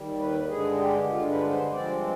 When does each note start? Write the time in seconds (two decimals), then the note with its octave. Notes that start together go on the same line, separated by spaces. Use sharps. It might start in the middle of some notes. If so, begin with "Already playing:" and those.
Already playing: D#2 D#3 G3
0.18 B4
0.48 G2 D3 G#3 G#4
0.78 G4
1.09 G2 D3 G#3 F4
1.29 B4
1.49 C5
1.70 G2 F3 G#3 C4 D5